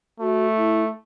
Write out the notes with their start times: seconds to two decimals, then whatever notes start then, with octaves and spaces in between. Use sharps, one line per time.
0.20 A3 F#4
0.57 E4